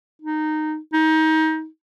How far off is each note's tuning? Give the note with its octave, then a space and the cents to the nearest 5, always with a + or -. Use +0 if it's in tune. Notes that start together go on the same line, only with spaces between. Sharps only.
D#4 -15
D#4 +25